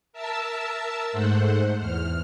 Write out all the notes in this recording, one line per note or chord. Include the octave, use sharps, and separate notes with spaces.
A#4 E5 A5 E6
G#2 A3 C5 F#5
E2 F6